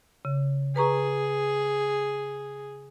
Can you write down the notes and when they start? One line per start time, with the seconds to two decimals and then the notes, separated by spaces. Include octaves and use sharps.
0.25 C#3
0.76 G#4 B4 A#5 C#6